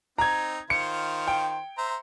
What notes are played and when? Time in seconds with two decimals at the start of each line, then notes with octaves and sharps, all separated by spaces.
0.18 C4 D#4 A#5 G#6
0.70 D#3 F4 C5 C#7
1.28 G5
1.78 C5 E5 A#5